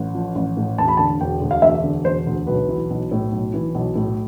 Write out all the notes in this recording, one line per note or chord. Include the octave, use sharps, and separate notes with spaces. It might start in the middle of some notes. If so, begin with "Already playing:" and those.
Already playing: A1
F3
A1
A2
E1 A5
B5
D3 A5
E1 G5
D2
F5
E1 E5
D3
E1 C5
D2
B1 B4
E3
B1
A2
B1
E3
B1
A2